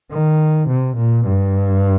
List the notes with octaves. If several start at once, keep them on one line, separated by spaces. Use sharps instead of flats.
D#3
C3
A#2
G2